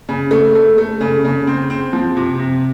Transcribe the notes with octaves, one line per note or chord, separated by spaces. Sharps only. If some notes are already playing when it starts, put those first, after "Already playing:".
C#3
A3
A3
A3
C#3
C#3
C4
C4
F3
C3
C3